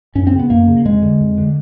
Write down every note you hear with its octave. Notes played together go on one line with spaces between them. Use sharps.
F#2 C#4
C4
C#3
B3
F#2 A#3
C#3
F2 G#3
D3
F2
D3